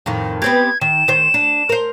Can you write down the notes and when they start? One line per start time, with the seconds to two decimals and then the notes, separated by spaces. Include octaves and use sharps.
0.06 F2 A2 D#3
0.42 B3 C4 G4 G#6
0.81 D#3 E7
1.08 D#3 C5
1.34 D4
1.69 A#4 C5